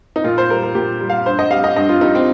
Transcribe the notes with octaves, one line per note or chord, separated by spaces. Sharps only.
D#4
A#2 F4
C5
G3 A#4
A#4
A#2 G4
G3
F5
G2 C5
D#5
G3 F5
D#5
G2 D#5
F4
G3 D#4
C4